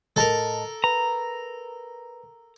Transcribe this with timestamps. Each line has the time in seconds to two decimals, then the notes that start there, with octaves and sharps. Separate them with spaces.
0.16 A2 A4 A#4 D#5 A5
0.84 B4 A#5